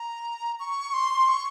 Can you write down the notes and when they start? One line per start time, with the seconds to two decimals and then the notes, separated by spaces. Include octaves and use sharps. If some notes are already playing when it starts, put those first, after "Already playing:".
Already playing: A#5
0.60 C#6
0.94 C6
1.28 C#6